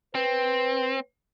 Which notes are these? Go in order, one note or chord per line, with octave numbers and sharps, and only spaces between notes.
C4 B4